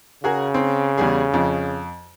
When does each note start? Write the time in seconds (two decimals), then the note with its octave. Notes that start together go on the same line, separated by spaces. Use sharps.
0.24 C#3 F#4 G#4 A#4
0.54 C4
0.98 E2 G3 G#4
1.34 F2